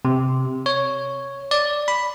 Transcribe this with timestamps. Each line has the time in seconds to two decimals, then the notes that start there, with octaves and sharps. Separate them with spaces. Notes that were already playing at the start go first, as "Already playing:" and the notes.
0.05 C3
0.66 C#5
1.51 D5
1.88 B5